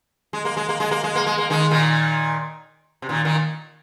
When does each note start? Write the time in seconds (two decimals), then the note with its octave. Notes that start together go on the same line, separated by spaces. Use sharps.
0.33 G#3
0.45 A#3
0.57 G#3
0.69 A#3
0.80 G#3
0.91 A#3
1.04 G#3
1.15 A#3
1.27 G#3
1.38 A#3
1.50 D#3 G#3
1.71 A#2 D#3
3.02 C3
3.09 A#2 D#3
3.25 A#2 D#3